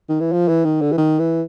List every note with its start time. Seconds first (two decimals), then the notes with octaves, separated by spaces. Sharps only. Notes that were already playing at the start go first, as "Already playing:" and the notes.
0.10 D#3
0.21 E3
0.32 F3
0.49 E3
0.65 D#3
0.82 D3
0.92 E3
0.98 D#3
1.20 E3